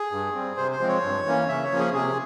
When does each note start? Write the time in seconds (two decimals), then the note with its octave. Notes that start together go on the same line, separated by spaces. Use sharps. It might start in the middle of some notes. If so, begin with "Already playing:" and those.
Already playing: G#4
0.12 G2
0.34 G3 C4
0.57 C3 C5
0.72 C5
0.80 F3 G#3 C4
0.88 C#5
1.03 G2
1.26 E3 A#3 C#4
1.48 C#3 E5
1.64 C#5
1.71 F3 A#3 C#4
1.79 G#4
1.94 C3 G#4